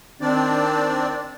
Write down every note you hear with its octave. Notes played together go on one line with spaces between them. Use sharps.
D#3 C4 D4 D5